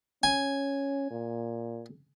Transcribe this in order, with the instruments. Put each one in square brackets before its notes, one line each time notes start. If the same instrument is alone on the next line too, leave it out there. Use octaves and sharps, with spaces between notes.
[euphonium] C#4 [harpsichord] G#5
[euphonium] A#2